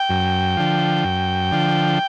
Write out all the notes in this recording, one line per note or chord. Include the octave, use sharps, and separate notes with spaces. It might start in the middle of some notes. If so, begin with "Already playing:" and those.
Already playing: G5
F#2
D3 F3
F#2
D3 F3